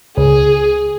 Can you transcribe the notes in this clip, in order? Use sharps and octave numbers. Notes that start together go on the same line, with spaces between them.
C#2 G#4